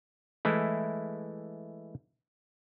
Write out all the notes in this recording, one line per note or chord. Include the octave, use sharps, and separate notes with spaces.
E3 G#3 A3 E4